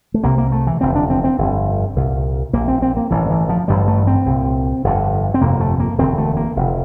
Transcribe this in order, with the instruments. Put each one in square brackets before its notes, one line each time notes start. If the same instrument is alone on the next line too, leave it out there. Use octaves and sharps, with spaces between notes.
[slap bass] A3
C2 C3 A#3
A#3
A3
E3
F1 E2 D3 C4
D4
C4
C4
G1 F2 D3
C2 A#2
A#1 A#2 A#3
C4
C4
A#3
A1 G2 D3 E3
E3
F3
A1 G2 D3 G3
A3
C4
C2 A#2
G1 F2 D3
C4
G1 F2 C3 A#3
A3
A#3
E1 D2 D3 C4
A3
A#3
F1 F2 C3